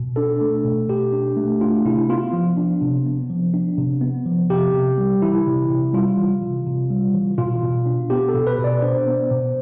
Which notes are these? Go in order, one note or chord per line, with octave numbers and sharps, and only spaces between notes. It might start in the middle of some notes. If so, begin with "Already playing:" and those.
Already playing: B2
D4 A4
A3
B2
B2 G4
D4
A3
D4 F4
C3 E4
B3 F4
F3
D4
C3
B3
F3
D4
C3
B3
F3
C3 G4
C3
G3
E3 E4
C3
C3
G3 F4
E3
C3
C3
G3
E3
B2 F4
B2
D4
B3 G4
A4
B2
B4
B2
D5
D4 C5
B3
B2